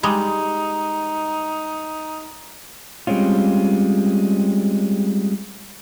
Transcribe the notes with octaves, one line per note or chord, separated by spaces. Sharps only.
G3 G#3 D#4
G3 G#3 C4 C#4 F4